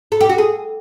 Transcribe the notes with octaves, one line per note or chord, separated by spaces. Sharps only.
A4
G4
F#4
G#4